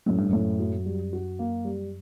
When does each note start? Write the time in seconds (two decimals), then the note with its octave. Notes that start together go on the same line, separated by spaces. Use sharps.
0.06 F#2 A2
0.18 G2
0.29 F#2 A2
0.60 F#3
0.86 G3
1.13 F#4
1.39 A#3
1.65 G3